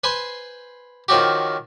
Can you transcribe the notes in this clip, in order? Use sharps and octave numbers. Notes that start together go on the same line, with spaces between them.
B4 C5 G#5 B5 C6
D#3 F3 F#3 F#4 G4